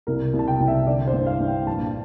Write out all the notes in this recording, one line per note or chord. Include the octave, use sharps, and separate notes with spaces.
C2 A#4
C2
A5
G5
C2
E5
D3 D5
C5
G2
F5
G2
G5
A#1 A5